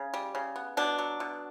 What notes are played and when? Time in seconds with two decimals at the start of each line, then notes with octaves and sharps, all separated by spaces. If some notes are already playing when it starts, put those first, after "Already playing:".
Already playing: C#3
0.14 G3
0.35 C#3
0.56 B3
0.77 B2 D4
0.99 F#3
1.20 B2